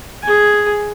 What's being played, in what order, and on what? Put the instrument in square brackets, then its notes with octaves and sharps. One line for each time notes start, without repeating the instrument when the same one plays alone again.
[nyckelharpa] G#4 G#5